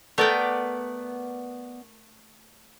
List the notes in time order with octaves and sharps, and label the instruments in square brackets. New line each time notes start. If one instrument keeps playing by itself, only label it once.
[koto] A3 A#4 G5 [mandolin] B3 D5